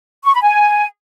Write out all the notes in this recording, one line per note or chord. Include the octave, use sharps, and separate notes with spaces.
C#6
B5
G#5